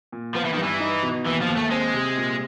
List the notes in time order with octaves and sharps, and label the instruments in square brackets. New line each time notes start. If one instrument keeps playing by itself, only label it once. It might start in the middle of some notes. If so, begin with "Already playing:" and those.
[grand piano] A#2
[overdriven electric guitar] F3 [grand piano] B3
[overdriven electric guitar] E3
[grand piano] G2 [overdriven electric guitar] D#3
[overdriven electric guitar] E3
[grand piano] D#4
B2
[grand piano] D#2 [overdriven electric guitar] E3
[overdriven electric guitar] F3
[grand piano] D#2
[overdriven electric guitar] A3
[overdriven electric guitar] G#3 [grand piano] C4
[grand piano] C3
A#2